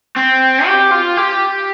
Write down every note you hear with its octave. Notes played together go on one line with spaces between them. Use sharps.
C4
G4
F4
G4